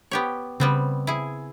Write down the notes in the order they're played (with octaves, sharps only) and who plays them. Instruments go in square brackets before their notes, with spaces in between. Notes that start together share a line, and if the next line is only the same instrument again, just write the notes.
[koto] B3 G4 C#5
[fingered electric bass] C#3 [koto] G3 B3 C4
[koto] E4 G#4